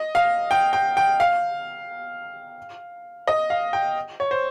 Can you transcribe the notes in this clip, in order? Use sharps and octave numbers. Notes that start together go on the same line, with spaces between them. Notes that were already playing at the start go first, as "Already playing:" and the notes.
Already playing: D#5
F5
G5
G5
G5
F5
D#5
F5
G5
C#5
C5